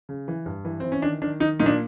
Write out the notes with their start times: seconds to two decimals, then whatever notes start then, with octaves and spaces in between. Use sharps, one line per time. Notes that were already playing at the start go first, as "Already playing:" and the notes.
0.09 C#3
0.28 E3
0.46 G2
0.65 E3
0.80 E3 C4
0.92 C#4
1.02 D#3 D4
1.22 D#3 D4
1.40 D#3 D#4
1.59 A#2 D#4
1.66 D4